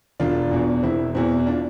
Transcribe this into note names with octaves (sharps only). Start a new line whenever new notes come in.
E1 D4 F4
E2 B2
E1 C4 E4
E2 B2 C4 E4
D4 F4